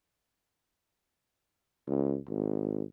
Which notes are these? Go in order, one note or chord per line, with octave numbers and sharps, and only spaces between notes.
C#2
G#1